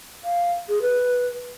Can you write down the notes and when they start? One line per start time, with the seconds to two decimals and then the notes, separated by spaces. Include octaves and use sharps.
0.25 F5
0.69 G#4
0.82 B4